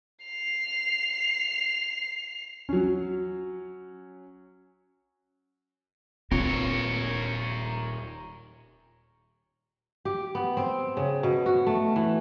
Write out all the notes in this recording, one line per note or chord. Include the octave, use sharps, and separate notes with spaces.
C7 F7
F#3 C#4
D#1 A#2 C4 F4 A#4 C#5
G4
B3
C4
C#3
B2
F#4
A3
E3